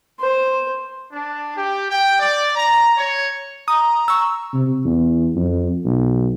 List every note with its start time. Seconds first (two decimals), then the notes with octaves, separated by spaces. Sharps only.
0.20 C5
1.11 D4
1.56 G4
1.90 G5
2.19 D5
2.56 A#5
2.97 C#5
3.68 A#5 D#6
4.08 C#6 E6
4.54 C3
4.85 E2
5.36 F2
5.85 B1